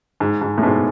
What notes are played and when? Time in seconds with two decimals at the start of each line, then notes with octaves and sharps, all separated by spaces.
0.20 G#2
0.42 G#2
0.58 A2
0.63 G#2 B2